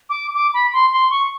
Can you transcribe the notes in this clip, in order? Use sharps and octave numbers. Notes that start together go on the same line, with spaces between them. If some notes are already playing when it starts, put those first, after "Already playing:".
D6
D6
B5
C6
C6
C#6